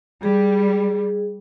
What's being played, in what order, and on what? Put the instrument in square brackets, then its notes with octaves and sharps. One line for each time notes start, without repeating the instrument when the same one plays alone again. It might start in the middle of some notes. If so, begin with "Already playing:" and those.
[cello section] G3 [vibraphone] G#4